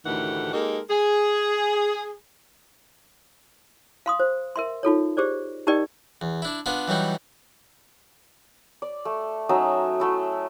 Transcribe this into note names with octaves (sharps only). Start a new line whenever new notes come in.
D2 A2 D#3 E3 G4 F#5
G#3 A#3 D#4 G4 A4 A#4
G#4
F5 C6 D#6
C5
A#4 E5 C6
D#4 F4 A4 C#5
G4 G#4 C5 D5
D#4 G4 A#4 D5 D#5 G5
E2
D4 E4
B3 D4 F4 G#5
E3 F#3 G3 D#4
D5
A3
F#3 C#4 D#4 E5
F#3 A3 E4